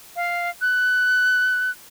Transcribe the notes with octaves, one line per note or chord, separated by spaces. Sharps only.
F5
F#6